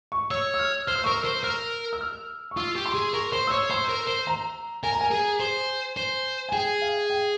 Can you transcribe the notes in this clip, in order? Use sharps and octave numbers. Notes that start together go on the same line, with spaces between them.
C#6
C#5 E6
E6
F6
C5 F6
E6
A#4 C#6
E6
C5
A#4 F6
E6
F6
C#6
F4 E6
G4
C6
G#4
A#4 C#6
C5 C6
E6
C#5 C#6
C5 C6
A#4
C5
A#5
A#4 G#5
A#5
G#5
G#4
C5
C5
G#5
G#4 G5
F5
G5